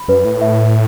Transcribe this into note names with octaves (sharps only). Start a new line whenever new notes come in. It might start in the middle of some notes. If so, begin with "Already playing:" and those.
Already playing: B5
F#2 B4
A2
E5